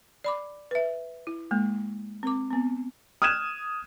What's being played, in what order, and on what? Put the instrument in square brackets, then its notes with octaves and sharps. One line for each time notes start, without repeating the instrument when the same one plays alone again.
[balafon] D5 B5 D6
B4 E5
E4
G#3 A#3
C4 A#4 D6
B3 C4
[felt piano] D#6 F6 F#6 G#6 D#7 E7